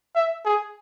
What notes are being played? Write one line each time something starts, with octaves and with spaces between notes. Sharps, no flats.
E5
G#4